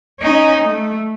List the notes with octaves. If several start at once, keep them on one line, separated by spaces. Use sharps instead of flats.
C#4 D#4
A3